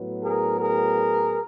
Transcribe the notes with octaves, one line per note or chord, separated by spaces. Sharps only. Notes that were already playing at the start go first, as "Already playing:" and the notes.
Already playing: A2 F#3 B3
G#4 A#4
G#4 A#4